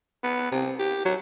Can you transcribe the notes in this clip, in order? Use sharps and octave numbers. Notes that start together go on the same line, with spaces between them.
B3
C3
G4
F#3